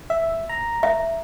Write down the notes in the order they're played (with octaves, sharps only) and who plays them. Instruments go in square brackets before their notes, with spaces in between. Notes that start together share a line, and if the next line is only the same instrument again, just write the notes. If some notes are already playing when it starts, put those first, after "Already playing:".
[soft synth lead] E5
A#5
[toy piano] E5